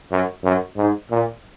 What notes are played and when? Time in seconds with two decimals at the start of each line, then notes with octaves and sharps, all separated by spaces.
0.11 F#2
0.44 F#2
0.77 G#2
1.10 A#2